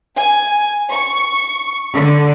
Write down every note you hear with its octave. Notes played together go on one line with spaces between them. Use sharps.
G#5
C#6
D3